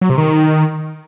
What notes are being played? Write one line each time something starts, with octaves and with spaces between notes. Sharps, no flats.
F#3
C3
D#3